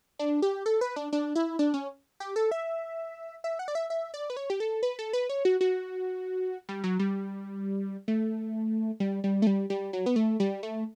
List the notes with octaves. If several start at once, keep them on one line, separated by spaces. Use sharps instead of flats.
D4
G4
A4
B4
D4
D4
E4
D4
C#4
G4
A4
E5
E5
F#5
D5
E5
E5
D5
B4
C#5
G4
A4
B4
A4
B4
C#5
F#4
F#4
G3
F#3
G3
A3
G3
G3
A3
G3
G3
F#3
B3
A3
G3
A3